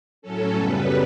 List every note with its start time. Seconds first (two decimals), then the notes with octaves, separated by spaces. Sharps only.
0.22 A2 F#3 C#4 A4
0.55 F#2 C#3 G3 B3 B4